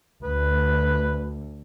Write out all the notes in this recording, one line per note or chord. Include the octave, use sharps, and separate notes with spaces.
D2 B4